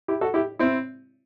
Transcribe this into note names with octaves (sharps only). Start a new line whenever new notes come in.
E4 G4
F#4 A4
E4 G4
C4 E4